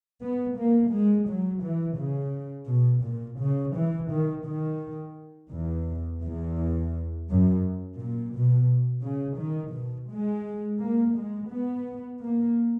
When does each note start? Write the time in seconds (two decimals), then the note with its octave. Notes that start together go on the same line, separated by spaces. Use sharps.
0.22 B3
0.59 A#3
0.94 G#3
1.29 F#3
1.64 E3
2.00 C#3
2.69 B2
3.06 A#2
3.41 C#3
3.76 E3
4.11 D#3
4.47 D#3
5.52 E2
6.23 E2
7.29 F#2
7.99 A#2
8.35 B2
9.05 C#3
9.40 D#3
9.75 B2
10.11 G#3
10.82 A#3
11.17 G#3
11.52 B3
12.22 A#3